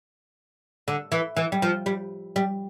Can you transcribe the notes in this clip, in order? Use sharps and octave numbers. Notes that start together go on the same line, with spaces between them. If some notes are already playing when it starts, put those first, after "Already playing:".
D3
E3
E3
G3
F3
G3
G3